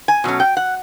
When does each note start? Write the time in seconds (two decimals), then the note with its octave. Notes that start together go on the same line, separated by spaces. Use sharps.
0.08 G#5
0.24 B2 F#3 A3 C#4
0.40 G5
0.57 F#5